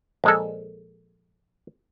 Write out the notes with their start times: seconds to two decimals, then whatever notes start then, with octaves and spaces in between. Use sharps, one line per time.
0.24 A#1 G#3 A4